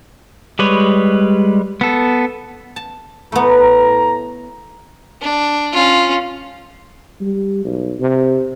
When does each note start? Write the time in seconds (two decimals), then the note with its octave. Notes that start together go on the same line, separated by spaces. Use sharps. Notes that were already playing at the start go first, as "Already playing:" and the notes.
0.59 G3 G#3 B4 C#5
1.81 B3 A4
2.76 A5
3.32 A2 A3 B3 A#5
5.22 D4
5.73 C#4 F4
7.21 G3
7.64 B1
8.00 C3